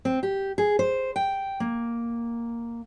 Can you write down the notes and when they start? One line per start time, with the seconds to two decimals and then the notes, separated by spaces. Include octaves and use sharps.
0.05 C4
0.23 G4
0.58 G#4
0.79 C5
1.16 G5
1.60 A#3